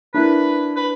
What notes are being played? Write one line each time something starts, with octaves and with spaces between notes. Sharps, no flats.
D4 E4 A#4 B4
B4